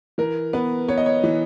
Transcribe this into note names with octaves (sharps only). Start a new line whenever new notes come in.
E3 A#4
B3 B4
B3 C#5
D#5
C#5
E3